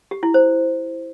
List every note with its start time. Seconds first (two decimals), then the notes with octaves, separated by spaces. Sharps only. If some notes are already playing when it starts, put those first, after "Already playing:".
0.11 G4
0.23 E4
0.34 C5